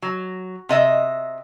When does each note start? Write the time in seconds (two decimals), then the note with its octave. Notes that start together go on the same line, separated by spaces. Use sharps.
0.02 F#3
0.69 C3 D#5 E5